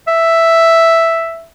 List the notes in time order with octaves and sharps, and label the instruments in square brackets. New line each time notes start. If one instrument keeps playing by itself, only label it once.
[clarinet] E5